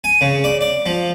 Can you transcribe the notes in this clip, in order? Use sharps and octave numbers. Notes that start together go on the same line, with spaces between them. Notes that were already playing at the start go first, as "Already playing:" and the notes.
G#5
C#3
D5
D5
F3